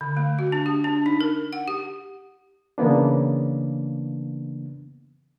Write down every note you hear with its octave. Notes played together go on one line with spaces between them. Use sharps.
D3
A3
F#4
D4
G4
D4
D#4
A#4
F#5
G4
C#3 E3 A#3 B3 D4